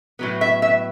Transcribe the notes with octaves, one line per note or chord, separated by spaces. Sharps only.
A2 F#3 B3
E5
E5